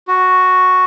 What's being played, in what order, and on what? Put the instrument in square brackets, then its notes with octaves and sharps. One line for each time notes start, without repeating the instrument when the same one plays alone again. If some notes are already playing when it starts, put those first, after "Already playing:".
[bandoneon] F#4